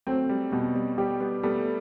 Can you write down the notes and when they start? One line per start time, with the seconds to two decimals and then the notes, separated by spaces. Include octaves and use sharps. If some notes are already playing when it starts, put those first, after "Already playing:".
0.07 F#3 A3 C4
0.29 G3
0.52 B2 G3
0.76 G3
0.98 G3 G4
1.20 G3 B3
1.43 G3 A3 B3